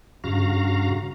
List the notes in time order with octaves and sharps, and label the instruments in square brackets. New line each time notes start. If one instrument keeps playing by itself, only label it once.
[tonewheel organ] G2 C#3 F#4 F5 A#5